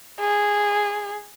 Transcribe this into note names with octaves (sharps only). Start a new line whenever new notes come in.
G#4